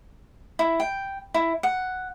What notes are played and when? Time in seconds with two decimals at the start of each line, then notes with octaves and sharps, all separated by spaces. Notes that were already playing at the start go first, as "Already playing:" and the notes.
0.59 E4
0.80 G5
1.34 E4
1.63 F#5